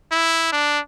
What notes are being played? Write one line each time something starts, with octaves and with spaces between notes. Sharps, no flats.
E4
D4